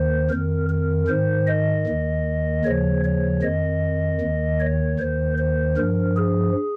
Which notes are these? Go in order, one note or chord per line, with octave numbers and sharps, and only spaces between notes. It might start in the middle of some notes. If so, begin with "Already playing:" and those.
Already playing: D#2 D#3 C5
F2 D#3 A#4
A#4
G#2 D#3 C5
D#5
D#2 D#3
D#2 C#3 F3 C#5
C#5
F2 D#3 D#5
D#2 D#3
C#5
D#2 D#3 C5
C5
G2 F3 A#4
G#4